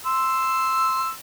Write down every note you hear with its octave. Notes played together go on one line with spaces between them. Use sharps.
C6 E6